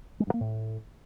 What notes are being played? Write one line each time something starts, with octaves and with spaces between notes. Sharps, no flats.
G#3
G2
A#3
A2